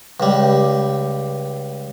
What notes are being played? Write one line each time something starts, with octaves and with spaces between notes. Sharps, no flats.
C#2 G3